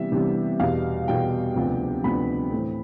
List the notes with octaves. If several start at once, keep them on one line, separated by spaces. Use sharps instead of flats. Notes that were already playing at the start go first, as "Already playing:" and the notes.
Already playing: C3 E3 G3 B3 E5
C3 E3 G3 B3
E2 B2 G3 F5
E2 B2 G3 G5
D2 C3 F3 B3 D4
D2 C3 F3 B3 D4 B5
A2 E3 A3 C4